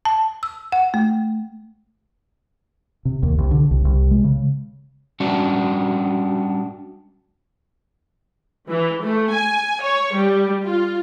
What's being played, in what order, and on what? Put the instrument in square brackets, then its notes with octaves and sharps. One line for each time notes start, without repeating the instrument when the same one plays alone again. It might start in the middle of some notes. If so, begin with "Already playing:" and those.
[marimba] A5
E6
F#5
A3
[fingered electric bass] C3
D#2
C2
D3
C2
C2
G#3
C#3
[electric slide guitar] G3 C#4 D4 F#4
[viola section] E3
A3
G#5
C#5
G3
F4